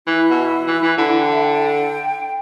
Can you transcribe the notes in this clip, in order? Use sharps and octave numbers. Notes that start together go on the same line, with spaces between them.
E3 E4
B2
E3
E3
D3 E4
G5
E5
G5